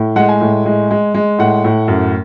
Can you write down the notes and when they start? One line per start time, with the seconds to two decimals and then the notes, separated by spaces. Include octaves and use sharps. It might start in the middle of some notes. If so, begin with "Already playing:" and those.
Already playing: A2
0.16 G#3 F#5
0.29 G#5
0.41 A2
0.65 G#3
0.91 G#3
1.14 G#3
1.39 A2 F#5
1.64 A2
1.88 F#2